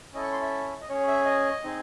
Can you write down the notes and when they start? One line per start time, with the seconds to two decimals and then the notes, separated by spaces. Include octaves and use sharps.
0.14 C#4 E4 A4 D#5
0.23 C#6
0.32 C6
0.42 E5
0.81 D#5
0.89 C#4 G#4 C#5
1.08 E5
1.25 D#5
1.63 C4 D#4 G#4